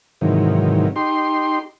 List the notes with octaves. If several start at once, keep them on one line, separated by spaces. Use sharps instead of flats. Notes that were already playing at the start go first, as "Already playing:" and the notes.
G#2 C3 D#3 E3 F#3
D#4 G4 C6